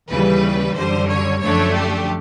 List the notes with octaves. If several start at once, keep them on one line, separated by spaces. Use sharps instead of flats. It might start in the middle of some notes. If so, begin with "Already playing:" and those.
D#2 C#3 E3 G3 B4
F#2 D3 G3 C5
C#5
F#2 D3 F3 A3 D4 C#5
G4